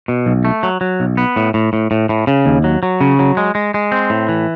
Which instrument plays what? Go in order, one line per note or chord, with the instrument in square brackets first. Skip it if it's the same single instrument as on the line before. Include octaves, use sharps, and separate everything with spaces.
[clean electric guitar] B2
B1
A3
F#3
F#3
B1
B3
A2
A2
A2
A2
A2
C#3
D#2
F#3
F#3
C#3
F#3
G#3
G#3
G#3
C4
A2
E3